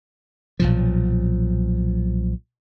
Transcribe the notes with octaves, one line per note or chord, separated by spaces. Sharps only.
B1 A#2 F3